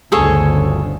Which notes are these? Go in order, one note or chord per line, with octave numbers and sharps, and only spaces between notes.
G1 D2 C#3 G#4 A4 C#5